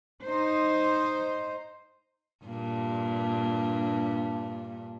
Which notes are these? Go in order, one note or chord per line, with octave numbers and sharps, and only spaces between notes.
D#4 C5
G2 A#2 D4